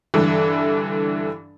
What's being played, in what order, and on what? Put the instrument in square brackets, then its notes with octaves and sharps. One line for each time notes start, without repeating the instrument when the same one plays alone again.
[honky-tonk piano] G2 D3 E3